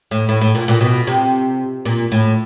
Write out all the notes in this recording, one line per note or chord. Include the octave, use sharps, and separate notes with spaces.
A2
A2
A2
A#2
A#2
B2
C3
A#2
A2